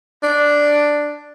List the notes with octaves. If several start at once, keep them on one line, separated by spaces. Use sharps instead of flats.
D4